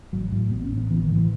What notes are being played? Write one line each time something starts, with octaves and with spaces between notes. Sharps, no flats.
A1 F#3
A2
A1 B3
C#4
A2
B3
A1 E3
D#3
A2
E3